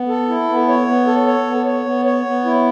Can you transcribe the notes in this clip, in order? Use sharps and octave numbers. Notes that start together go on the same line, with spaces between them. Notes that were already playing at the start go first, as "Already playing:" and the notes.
Already playing: B3
A4
E4
B3
C#5
B3
A4
C#5
B3
C#5
B3
C#5
B3
E4